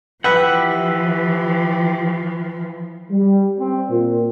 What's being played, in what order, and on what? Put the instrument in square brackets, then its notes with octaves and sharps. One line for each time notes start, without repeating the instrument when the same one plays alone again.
[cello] E3 F3 [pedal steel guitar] G4 E5 F#5 [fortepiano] B4
[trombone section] G3
C4
A#2